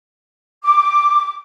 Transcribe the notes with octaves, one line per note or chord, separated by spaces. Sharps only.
D6